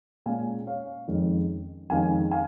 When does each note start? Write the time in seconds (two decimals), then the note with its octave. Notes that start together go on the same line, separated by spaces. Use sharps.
0.26 A#2 G#3 C#4 F5 G#5
0.67 C#5 F5
1.08 F2 D#3 G#3 C#4
1.90 F2 D#3 G#3 C#4 F5 G#5
2.31 F5 G#5